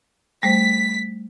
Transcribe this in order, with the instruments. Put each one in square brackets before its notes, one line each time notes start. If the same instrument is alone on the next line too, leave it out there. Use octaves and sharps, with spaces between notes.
[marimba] G3 A3 C5 [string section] B6